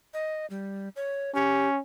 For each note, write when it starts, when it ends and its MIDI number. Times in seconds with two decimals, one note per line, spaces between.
0.14 0.46 75
0.50 0.89 55
0.96 1.33 73
1.35 1.79 61
1.35 1.68 67